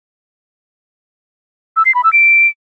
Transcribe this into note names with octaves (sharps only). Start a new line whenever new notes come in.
E6
C7
B5
E6
D7